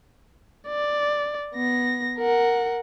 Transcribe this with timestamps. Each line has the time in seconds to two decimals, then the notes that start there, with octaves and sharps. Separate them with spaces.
0.68 D5
1.55 B3 A#6
2.19 A#4 F#5